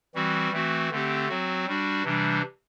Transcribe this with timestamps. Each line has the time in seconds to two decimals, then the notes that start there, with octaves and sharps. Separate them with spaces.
0.15 E3 G3 C4 F#4
0.52 E3 A3 C4 F#4
0.91 D3 A3 C4 G4
1.29 F#3 C4 F#4
1.67 G3 D4 F#4
2.04 C3 E3 G3 D4